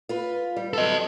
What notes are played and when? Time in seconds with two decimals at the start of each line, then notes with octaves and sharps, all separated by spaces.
0.09 F4 B4
0.56 G3
0.73 A4 D#5